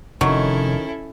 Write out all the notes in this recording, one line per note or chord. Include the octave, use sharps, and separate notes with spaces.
F1 D#3 F#3 C#4 E4 A4